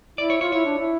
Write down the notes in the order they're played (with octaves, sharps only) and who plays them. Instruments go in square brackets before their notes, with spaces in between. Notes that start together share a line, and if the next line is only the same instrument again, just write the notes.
[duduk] E4 [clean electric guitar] D5
[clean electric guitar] C#5
[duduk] F4 [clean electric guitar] C#5
[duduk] E4 [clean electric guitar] C#5
[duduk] D4
E4